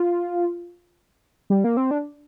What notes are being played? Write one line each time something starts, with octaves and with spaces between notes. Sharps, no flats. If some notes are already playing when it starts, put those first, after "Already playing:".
Already playing: F4
G3
A#3
C4
D4